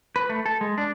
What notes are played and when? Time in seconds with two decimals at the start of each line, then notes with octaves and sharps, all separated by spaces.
0.16 B4
0.29 A3
0.46 A4
0.61 G#3
0.78 D4